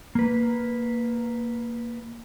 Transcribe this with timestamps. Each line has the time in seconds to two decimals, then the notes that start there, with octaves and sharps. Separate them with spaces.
0.15 A#3 B4